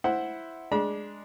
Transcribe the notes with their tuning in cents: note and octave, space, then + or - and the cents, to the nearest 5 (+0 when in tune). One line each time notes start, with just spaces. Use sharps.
E4 +0 C5 +0 F#5 +0
G#3 +0 D4 +0 B5 -45